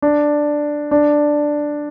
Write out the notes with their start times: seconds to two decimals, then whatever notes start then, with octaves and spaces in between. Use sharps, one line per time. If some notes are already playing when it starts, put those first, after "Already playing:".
0.02 D4
0.91 D4